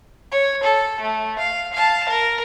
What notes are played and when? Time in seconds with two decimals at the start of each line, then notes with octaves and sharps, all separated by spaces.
0.31 C#5
0.63 A4
1.00 A3
1.38 F5
1.73 F5 A5
2.09 A#4